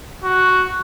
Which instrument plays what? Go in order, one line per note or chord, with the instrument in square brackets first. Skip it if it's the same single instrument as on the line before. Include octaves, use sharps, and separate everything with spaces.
[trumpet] F#4